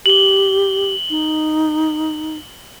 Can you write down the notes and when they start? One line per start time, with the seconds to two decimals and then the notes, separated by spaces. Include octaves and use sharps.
0.06 G4 F#7 G7
1.10 D#4